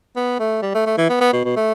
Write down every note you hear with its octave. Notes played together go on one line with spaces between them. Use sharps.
B3
A3
G3
A3
A3
E3
B3
B3
B2
B2
A3